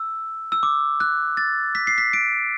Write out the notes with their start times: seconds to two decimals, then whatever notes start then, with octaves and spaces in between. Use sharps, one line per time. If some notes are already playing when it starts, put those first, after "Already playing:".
Already playing: E6
0.52 E6
0.63 D6
1.00 F#6
1.37 A6
1.75 B6
1.87 C7
1.98 B6
2.13 D7